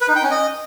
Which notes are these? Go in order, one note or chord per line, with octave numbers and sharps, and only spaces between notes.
B4
D#4
G5
C#4
D#5